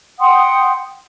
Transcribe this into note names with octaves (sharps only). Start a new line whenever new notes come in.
F#5 G5 C6 D#6